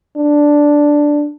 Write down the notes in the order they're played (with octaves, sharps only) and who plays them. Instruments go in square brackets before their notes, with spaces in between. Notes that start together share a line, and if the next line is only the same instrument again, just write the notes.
[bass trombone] D4